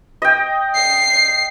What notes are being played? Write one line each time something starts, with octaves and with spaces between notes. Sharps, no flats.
D#5 G5
C7